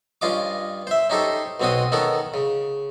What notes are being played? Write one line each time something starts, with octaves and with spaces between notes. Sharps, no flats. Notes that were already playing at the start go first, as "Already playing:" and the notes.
G2 C#4 F4 D#5 D6
C5 E5
C#4 D#4 G4 A4 C5
B1 B2 C4 C#4 F#4 D#6
D#3 B3 C#4 A4 A#4
C#3